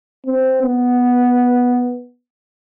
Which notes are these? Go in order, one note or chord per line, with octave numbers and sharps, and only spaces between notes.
C4
B3